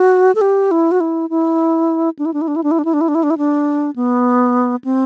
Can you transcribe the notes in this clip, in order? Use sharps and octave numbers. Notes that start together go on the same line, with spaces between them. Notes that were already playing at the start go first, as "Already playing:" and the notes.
Already playing: F#4
A4
G4
E4
F#4
E4
E4
D4
E4
D4
E4
D4
E4
D4
E4
D4
E4
D4
E4
D4
E4
D4
E4
D4
B3
C4